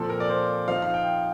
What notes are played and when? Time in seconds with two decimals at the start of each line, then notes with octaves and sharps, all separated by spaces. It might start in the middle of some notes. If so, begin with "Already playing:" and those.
Already playing: A#2 F3 C4 A4
0.10 A#4
0.20 D5
0.30 C5
0.68 F3 C4 D#4 F5
0.82 F5
0.94 G5